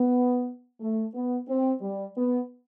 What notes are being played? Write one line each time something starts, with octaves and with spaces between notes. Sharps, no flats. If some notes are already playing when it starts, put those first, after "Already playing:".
Already playing: B3
A3
B3
C4
G3
B3